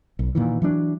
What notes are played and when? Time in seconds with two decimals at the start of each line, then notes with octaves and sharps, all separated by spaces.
0.19 B1
0.35 A#2 D#3 E3
0.62 E3 F#3 D4